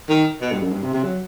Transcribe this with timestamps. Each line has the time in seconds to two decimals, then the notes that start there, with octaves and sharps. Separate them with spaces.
0.09 D#3
0.41 B2
0.52 G2
0.62 F#2
0.72 G2
0.83 C3
0.94 C3
1.03 F#3